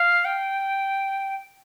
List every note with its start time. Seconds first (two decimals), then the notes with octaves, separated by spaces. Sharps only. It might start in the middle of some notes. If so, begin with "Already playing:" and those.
Already playing: F5
0.25 G5